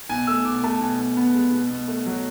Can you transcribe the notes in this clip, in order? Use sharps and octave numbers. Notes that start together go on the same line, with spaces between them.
B2 G#5
A3 E6
B2 D6
A3 A5
B2 G#5
B2
B3
G#3
B2
B2
A3
F#3